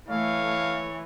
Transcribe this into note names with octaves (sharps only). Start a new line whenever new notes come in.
E3 A3 C#5 F5